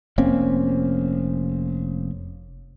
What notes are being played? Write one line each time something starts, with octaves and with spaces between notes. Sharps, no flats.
F1 A#3 C4 C#4